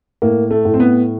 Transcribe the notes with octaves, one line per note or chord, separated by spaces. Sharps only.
A2 A#3
A3
A2
C4
B3